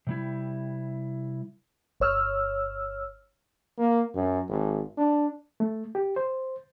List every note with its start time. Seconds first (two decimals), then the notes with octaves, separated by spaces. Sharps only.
0.07 C3 G3 E4
2.00 G1 C#5 E6 F6
3.78 A#3
4.15 F#2
4.49 G#1
4.97 D4
5.60 A3
5.95 G4
6.16 C5